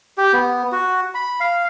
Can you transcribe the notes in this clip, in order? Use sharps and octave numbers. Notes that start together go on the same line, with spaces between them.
G4
B3
F#4
B5
F5